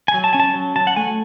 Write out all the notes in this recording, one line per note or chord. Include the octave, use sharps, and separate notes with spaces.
G#5
F#3
A5
C#4 G#5
A5
F#3
F#3 A5
F#5
A3 G#5